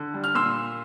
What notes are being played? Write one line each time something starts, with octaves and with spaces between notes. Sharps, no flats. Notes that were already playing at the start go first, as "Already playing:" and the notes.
Already playing: D3
G3
F6
A#2 C6 E6